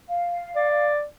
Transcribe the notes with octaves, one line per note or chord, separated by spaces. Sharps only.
F5
D5